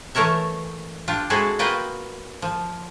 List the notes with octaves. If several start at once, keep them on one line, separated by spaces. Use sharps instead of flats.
E3 A3 A#4 C#5 E5
D4 F4 G4
G#3 C4 E4 F#4 G#4 A4
A#3 F4 F#4 B4 D#5 G5
F3